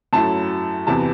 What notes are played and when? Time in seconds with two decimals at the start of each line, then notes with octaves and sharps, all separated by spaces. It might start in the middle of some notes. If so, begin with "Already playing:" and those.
0.13 F#2 F#3 A3 E4 A5
0.87 E2 C3 E3 B3 A5